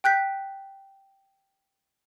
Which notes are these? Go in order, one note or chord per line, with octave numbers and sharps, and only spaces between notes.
G5 F#6 G6 B6